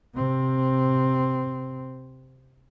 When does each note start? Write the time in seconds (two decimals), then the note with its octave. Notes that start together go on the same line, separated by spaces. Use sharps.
0.14 C3 C4